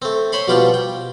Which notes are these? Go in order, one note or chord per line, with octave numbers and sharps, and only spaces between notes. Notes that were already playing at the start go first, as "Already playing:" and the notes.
A3 C4
C5 C#5 B5 C6
B2 F3 G3 F4 G5
G5